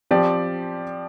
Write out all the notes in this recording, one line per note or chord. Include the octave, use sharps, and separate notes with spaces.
F3 C4 G4 D5